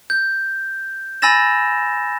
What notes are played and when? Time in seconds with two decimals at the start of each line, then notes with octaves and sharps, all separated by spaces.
0.10 G6
1.22 G#5 B5 E6 A6 A#6 E7